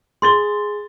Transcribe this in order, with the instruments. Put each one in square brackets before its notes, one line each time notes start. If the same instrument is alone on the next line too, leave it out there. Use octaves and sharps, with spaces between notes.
[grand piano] G#4 A6 G7 [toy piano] C6